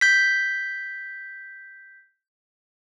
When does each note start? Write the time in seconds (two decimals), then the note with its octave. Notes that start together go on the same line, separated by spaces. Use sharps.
0.01 G6 B6